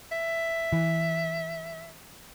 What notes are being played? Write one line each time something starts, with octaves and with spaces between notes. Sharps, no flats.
E5
E3